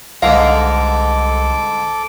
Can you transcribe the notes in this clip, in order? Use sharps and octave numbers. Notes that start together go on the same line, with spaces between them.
C2 G#2 D3 A4 F5 A#5 D6